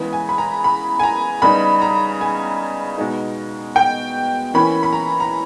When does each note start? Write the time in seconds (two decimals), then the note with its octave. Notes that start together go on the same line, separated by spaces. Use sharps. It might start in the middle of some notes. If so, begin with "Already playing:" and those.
Already playing: C#3 E3 G#3 B3
0.13 G#5
0.29 B5
0.38 A#5
0.64 B5
1.00 G#5
1.03 A#5
1.42 C#3 G3 B3 D#4 B5
1.82 A#5
2.21 G#5
2.98 B2 G#3 D#4
3.76 G5
4.54 E3 A#3 C#4 B5
4.83 B5
4.93 A#5
5.20 A#5